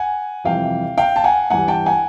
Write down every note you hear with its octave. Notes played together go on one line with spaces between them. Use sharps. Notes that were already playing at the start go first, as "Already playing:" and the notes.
Already playing: F#5 G#5
F2 C3 E3 G3 F5 G5
F5 G5
A5
F#5 G#5
G2 E3 G3 F#5 G#5
G5 A5
F#5 G#5